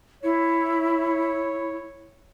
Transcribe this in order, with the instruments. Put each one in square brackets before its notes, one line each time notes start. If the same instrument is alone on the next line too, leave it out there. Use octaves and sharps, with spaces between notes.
[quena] E4 [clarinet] C#5